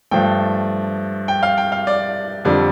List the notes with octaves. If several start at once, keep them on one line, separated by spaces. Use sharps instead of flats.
G2 F3 A3 G5
G5
F5
G5
F5
D5
F2 D3 G3 D5